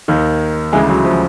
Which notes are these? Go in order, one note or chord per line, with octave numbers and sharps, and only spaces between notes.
D#2 D#3
D2 C#3 E3 G#3
F#3
F3